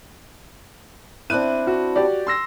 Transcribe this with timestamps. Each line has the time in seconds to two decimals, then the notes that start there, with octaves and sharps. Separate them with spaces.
1.30 C4 D4 E4 F#6 D#7
1.67 F#4
1.96 G4 D5
2.27 C6 E6 A#6